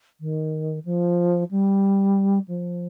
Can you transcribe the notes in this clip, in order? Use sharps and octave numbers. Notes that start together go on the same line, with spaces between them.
D#3
F3
G3
F3